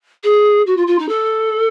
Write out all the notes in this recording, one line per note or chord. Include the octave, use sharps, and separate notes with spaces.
G#4
F#4
F4
F4
D#4
A4